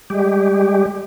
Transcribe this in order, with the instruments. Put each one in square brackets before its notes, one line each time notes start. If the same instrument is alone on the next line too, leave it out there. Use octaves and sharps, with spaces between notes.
[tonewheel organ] G3 G#3 G4